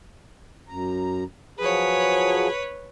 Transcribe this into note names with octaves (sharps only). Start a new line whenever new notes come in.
F#2 A#5
F3 F#3 G#4 B4 C#5